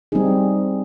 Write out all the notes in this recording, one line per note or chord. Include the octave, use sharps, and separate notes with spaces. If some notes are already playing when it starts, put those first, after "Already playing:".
G3 C4 D#4 G#4